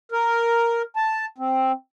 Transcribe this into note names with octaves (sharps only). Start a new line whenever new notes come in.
A#4
A5
C4